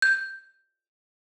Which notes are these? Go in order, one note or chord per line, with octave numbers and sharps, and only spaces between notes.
G6